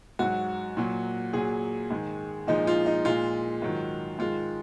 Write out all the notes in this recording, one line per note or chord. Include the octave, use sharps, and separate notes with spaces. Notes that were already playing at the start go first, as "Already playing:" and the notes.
G#2 F#3 F#4
A#2 F#3
A#2 F#3 G#4
G#2 D#3 G#3
A#2 F3 G#3 D#4
F4
D#4
A#2 G#3 F4
G#2 D#3 F#3
G#2 D#3 G#3 F4